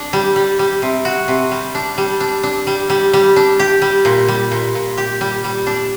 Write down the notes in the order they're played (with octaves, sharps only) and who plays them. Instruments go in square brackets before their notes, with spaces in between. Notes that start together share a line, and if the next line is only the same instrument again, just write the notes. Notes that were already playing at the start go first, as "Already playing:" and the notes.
Already playing: [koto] D4
G3
G3
G3
C3
F#4
C3
G3
D4
G3
D4
D4
G3
G3
G3
D4
G4
G3
A#2
G3
A#2
A#2
G4
G3
G3
D4